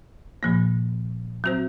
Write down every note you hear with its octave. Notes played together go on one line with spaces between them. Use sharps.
A#2 F3 A#3
F#3 C4 F#4 C5